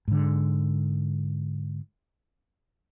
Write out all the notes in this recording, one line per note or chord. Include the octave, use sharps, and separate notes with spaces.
G#2 D3